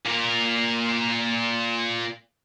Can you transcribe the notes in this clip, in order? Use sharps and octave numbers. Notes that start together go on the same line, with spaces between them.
A#2 A#4